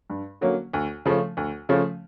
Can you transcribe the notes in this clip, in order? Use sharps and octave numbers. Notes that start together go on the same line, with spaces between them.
G2
D3 F#3 A#3 C#4
D2
C#3 F3 A3 C#4
D2
C#3 F3 A3 C#4